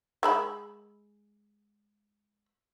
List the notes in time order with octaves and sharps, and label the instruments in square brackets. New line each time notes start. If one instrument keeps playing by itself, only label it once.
[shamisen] G#3 E5 B5